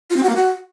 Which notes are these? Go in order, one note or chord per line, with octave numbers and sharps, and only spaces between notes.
F4
C4
F#4
A#3
F#4